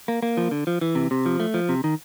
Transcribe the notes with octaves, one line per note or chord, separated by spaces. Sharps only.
A#3
A#3
F3
D3
F3
E3
C3
C3
F3
A3
F3
C3
D#3